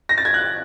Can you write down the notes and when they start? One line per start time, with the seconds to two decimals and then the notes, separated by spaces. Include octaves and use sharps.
0.09 A#6
0.18 A6
0.25 G#6
0.34 F#6